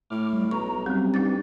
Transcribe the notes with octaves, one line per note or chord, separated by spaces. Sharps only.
A2 D6 F6
G3
B1 A#5 C#6
F#2 F#3 G3 C4 G4
G2 D4 D#4 A6